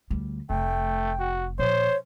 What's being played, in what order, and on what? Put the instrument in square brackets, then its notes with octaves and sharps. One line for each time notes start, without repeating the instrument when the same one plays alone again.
[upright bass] D2 G3
[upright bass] F1 [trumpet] A3 [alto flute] G5
[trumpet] F#4
[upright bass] A#2 F3 [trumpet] C5 [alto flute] C#5